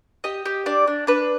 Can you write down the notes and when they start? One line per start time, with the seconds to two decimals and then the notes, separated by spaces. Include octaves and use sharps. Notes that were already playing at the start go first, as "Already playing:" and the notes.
0.24 G4 D#5
0.46 G4
0.66 D4 D5
0.87 D4
1.07 D4 B4